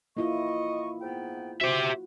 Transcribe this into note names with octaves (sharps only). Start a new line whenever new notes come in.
A#3 E4 F4 D#5 C#6
G#2 B3 G5
F#4 G4 C5 E5